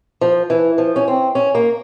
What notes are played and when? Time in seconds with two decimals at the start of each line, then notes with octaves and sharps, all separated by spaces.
0.21 F3
0.50 E3
0.78 F3
0.96 C#4
1.08 C4
1.35 C#4
1.55 A#3